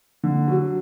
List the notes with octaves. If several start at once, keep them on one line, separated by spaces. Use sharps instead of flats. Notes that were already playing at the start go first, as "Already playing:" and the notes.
D3
F#3